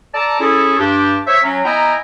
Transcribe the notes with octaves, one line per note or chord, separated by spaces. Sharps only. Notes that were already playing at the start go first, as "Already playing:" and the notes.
A4 D5 A5 A#5
C#4 E4 G#4 A4
G2 D4 G4
C5 C#5 E5
F#3 C#4
B3 E4 D#5 G5 G#5 A#5